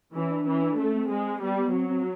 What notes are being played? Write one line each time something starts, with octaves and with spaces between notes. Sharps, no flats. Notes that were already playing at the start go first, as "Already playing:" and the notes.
E3 C#4
D4
E3 C#4
D4
A3 C#4
C4
G#3
G3 B3
B3
F#3 C4
C4